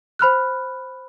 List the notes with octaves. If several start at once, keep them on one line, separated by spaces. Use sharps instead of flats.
C5 B5 F6 F#6